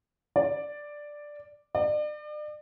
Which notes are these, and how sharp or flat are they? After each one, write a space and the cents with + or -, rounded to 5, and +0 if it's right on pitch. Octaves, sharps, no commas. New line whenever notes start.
D5 +5
D5 +40